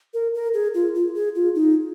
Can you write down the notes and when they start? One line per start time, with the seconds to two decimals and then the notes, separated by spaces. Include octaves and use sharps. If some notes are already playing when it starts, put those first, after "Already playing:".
0.14 A#4
0.34 A#4
0.54 G#4
0.74 F4
0.95 F4
1.15 G#4
1.35 F4
1.55 D#4